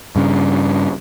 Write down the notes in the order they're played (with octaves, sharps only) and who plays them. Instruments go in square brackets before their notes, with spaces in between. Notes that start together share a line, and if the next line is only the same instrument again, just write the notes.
[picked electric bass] G2 C#3